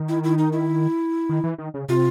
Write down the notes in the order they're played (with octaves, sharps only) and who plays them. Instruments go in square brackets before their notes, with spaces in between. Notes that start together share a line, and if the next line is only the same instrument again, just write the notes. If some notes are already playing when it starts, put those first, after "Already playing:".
Already playing: [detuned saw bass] D#3
[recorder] E4
E4
D#4
E4
[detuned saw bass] D#3
E3
D#3
C#3
[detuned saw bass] C3 [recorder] F4